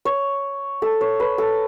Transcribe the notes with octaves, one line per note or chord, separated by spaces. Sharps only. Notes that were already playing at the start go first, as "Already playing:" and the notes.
C#5
A4
C#5
B4
A4